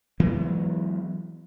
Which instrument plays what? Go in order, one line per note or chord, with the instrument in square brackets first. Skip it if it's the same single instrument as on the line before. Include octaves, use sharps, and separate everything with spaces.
[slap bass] E3 F#3 G#3 B3